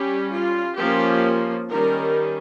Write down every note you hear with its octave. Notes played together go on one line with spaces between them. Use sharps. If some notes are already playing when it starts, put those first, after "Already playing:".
Already playing: G3 C#4 G4
F4
F3 A#3 C#4 G4
D#3 G3 C#4 A#4